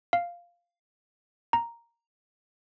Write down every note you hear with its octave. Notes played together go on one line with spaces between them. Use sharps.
F5
A#5